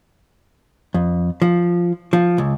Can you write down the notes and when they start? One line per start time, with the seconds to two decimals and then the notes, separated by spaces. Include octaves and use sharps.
0.94 F2
1.42 F3
2.13 F3
2.38 C#2